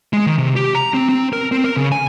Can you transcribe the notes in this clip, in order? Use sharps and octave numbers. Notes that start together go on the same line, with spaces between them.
G#3
D#3
C3
G4
A#5
C4
C4
A#4
C4
A#4
C#3
G#5